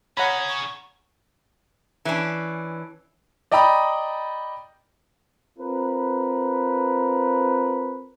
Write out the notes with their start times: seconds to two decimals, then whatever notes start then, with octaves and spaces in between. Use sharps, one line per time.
0.17 C#4 G#4 C#5 F#5 A#5 B5
0.48 C#6
2.05 E3 C#4 D4
3.52 D5 D#5 G5 A#5 B5 D#6
5.59 C4 F4 A#4 B4